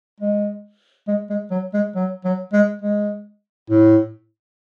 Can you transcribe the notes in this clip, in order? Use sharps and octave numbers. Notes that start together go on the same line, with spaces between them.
G#3
G#3
G#3
F#3
G#3
F#3
F#3
G#3
G#3
A2